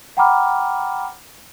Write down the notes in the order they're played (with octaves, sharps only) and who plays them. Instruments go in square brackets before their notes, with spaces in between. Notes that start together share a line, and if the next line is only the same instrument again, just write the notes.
[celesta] F#5 G5 A#5 B5 D6 F6